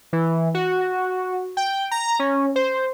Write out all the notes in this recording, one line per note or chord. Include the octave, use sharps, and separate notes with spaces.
E3
F#4
G5
A#5
C#4
C5